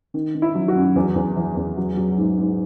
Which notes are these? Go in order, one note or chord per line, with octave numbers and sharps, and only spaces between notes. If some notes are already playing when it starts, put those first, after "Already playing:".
D#3
D#3
E4
F#3
F#4
F#2
E2
E2
E3
E2
F#3
F#3
G#2
G#2